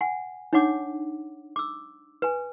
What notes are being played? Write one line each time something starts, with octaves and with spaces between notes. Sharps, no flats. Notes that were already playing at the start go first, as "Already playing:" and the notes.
F#5 G#5
D4 D#4 C#5 F#5 D6
D6 E6
B4 G#5